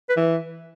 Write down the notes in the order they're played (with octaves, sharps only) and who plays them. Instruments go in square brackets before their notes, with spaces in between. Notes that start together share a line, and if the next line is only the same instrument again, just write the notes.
[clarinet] B4
[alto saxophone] E3